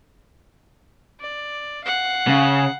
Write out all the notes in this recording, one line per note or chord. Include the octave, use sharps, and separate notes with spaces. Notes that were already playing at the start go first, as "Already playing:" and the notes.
D5
F5 F#5
C#3